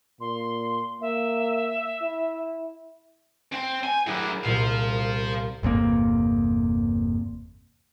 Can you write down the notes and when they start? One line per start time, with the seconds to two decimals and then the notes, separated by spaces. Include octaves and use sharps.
0.21 A#2 C6
1.01 A#3 E5
2.02 E4
3.53 C4
3.84 G5 G#5
4.07 F#3 D4 E4 G#4 A#4
4.45 C2 A#2 C5 F5
5.63 G1 E2 C3 A#3